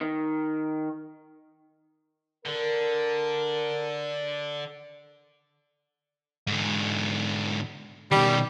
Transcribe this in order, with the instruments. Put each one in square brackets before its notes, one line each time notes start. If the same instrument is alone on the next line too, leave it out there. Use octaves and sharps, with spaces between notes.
[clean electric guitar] D#3
[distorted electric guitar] D3 [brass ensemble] A#4
[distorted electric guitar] G#2 D3
[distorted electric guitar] B2 D#3 [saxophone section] G3